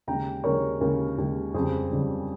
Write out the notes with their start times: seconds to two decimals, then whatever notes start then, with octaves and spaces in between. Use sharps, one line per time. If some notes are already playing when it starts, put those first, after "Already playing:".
0.07 D#2 C#3 G#3 G5 A#5
0.44 D#2 C#3 G#3 A#4 C#5
0.81 D#2 C#3 G#3 A#4
1.18 D#2 C#3 G#3
1.54 F2 C#3 G3 G#4 C5
1.91 F2 C#3 G3